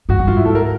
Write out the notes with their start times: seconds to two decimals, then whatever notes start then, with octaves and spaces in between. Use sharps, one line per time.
0.09 G2 F#4
0.19 G2
0.27 G#2 F4
0.37 E4
0.45 A4
0.55 A#4